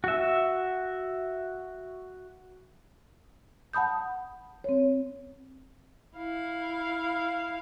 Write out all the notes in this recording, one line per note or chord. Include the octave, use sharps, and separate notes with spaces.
F#4 E5
F#5 A5 B5 D#6 G6
C4 C#5
E4 F5